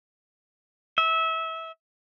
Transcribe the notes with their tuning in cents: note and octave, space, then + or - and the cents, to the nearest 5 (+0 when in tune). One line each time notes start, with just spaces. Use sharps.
E5 -25